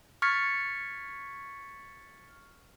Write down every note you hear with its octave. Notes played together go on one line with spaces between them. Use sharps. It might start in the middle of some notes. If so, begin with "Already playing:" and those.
C#6 F6 G#6 A6 B6 C#7